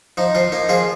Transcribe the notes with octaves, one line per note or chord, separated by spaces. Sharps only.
F3 D#4
F3 F4
A#3 D#4
F3 F4 G#4